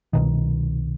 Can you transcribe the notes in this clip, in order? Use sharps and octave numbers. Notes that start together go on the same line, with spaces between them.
C2 B2 D#3